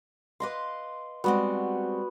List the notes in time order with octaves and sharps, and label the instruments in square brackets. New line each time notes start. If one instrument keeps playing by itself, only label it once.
[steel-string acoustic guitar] B4 D#5 F5 [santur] C6 D6
[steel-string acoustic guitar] G3 G#3 C4 [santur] B3 F#4